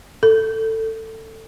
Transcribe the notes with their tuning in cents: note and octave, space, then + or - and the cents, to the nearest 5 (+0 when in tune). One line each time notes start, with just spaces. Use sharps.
A4 +20